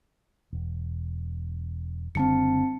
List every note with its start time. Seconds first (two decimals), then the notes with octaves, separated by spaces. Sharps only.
0.53 E1
2.15 F#1 D3 G3 C4 A5 C#7